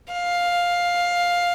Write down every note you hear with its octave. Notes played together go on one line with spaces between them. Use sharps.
F5